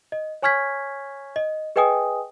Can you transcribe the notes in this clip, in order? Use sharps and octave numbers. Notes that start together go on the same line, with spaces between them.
D#5
C#5 G#5 C#6 F6 G#6 B6
D#5
G#4 B4 D#5 G5 G#5 D#6